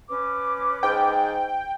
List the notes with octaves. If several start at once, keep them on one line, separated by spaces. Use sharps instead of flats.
C#4 B4 D6
G#2 G5